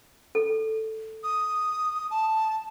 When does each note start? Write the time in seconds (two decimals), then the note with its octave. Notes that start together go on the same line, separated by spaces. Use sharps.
0.35 A4
1.24 D#6
2.11 A5